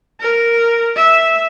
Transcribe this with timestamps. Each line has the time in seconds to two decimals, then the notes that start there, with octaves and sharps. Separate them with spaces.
0.20 A#4
0.96 E5